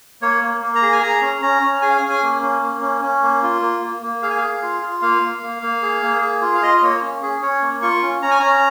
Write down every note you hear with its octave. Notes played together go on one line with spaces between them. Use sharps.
A#3 C#5
A#3
A#3
A#5
G#4
G#5
G#4 A#5
C#4
C#4 A#5
C#4
G#4 G#5
F5
G#5
C#4
G#5
A#3
C#4
A#3
C#4
C#4
A#3
F4
A#3
A#3
A#3
G#4 F5
G#5
F5
G#4
F4
F4
A#3 F5
A#3
A#3
A#3
G#4
A#3
G#4
F4
F5
F4 D#5
D#5
A#3 C#5
C#4
C#4 G#4
C#4 C#5
A#3
F4 C#6
C#4
C#4 A#5
G#5
C#4 A#5